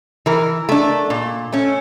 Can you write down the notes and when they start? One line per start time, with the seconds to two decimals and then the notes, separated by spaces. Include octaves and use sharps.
0.26 E3 A#4
0.69 A3 D4
1.10 A#2
1.52 A3 C#4